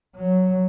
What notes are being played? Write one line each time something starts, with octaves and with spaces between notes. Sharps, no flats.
F#3